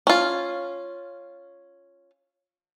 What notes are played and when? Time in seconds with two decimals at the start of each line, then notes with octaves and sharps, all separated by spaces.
0.07 C#4 F4